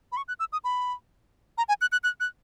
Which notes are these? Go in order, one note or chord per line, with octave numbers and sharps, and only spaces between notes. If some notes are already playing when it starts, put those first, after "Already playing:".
B5
C#6
F#6
E6
D#6
B5
A#5
G#5
F#6
F#6
F#6
F#6